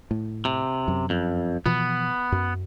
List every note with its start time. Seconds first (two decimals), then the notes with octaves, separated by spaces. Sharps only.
0.11 A2
0.45 C3
0.88 F#2
1.10 F2
1.66 B2 E3 F3 B3
2.32 F#2